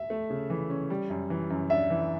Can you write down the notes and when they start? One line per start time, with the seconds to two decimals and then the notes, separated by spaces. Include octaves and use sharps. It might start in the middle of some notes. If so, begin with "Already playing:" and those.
Already playing: E5
0.10 A3
0.30 C#3
0.50 E3
0.70 C#4
0.90 G3
1.10 F#2
1.30 E3
1.50 F#2
1.70 D4 E5
1.90 E3